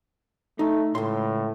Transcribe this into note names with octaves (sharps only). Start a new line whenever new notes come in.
A3 D#4
C#2 A2 C6